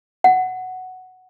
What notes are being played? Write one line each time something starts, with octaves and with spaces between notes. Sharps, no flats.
F#5